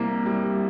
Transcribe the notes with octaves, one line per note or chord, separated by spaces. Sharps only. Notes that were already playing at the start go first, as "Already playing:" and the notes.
Already playing: C2 C3 A#3
G3